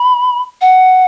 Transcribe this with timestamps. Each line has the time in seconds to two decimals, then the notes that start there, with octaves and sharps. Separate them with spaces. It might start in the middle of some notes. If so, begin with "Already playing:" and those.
Already playing: B5
0.61 F#5